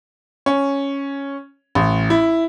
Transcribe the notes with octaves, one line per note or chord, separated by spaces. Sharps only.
C#4
A1
E4